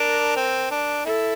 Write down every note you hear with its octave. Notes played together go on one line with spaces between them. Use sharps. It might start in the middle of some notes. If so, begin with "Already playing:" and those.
Already playing: D4 A#4
C4
D4
E4 A4